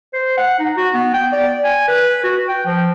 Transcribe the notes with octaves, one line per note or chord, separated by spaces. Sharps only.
C5
F#5
D#4
F#4
B3
G5
D5
G#5
B4
F#4
G5
F3